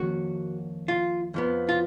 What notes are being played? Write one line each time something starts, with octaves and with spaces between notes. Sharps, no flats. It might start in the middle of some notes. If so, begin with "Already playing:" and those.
Already playing: F2 D#3 A#3 C#4 F#4
F4
F2 F3 B3
F4